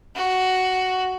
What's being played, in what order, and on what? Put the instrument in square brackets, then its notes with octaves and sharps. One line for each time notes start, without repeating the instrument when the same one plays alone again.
[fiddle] F#4